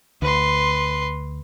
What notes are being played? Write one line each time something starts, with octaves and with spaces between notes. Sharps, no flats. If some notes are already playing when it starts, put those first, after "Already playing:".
D2 B4 C6